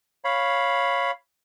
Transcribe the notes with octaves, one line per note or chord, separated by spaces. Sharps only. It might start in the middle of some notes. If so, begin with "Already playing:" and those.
C#5 F5 B5